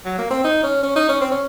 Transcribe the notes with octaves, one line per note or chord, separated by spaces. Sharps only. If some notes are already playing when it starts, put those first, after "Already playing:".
F#3
A#3
C4
D#4
C#4
C#4
D#4
C#4
C4
C#4